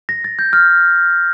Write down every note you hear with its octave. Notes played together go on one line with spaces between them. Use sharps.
A#6
A6
G6
F6